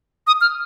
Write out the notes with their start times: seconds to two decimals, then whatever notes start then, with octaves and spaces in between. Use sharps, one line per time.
0.27 D#6
0.41 F6